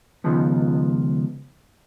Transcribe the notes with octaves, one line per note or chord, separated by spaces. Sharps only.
C#2 D#3 F3 B3